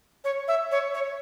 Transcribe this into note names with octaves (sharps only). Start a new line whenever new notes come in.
C#5
E5
C#5
C#5